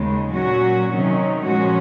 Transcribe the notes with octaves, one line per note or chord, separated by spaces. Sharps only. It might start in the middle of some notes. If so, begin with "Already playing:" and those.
Already playing: D#2 C#3 G#3
A#2 F#3 C#4 F#4
C3 D#3 F#3 C#4
A#2 F3 G#3 C#4 F#4